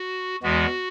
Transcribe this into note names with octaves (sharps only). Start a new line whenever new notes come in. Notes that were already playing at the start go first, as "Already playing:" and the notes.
Already playing: F#4
E2 E3 G#3 B3 F#4